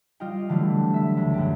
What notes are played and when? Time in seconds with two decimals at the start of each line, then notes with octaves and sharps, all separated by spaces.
0.20 G3 F4 D#5 F5 G5
0.49 D3 E3 F#3 G3 A3
0.94 E5 B6
1.17 C#2
1.34 F#2 G4